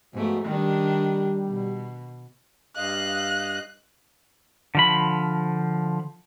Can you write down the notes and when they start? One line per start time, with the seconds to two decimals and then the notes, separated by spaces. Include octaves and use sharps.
0.14 G#2 F3 A3 B3 F#4
0.45 D#3 G3 D4
1.46 B2
2.77 G2 D#5 F5 F#6
4.75 D3 F3 B5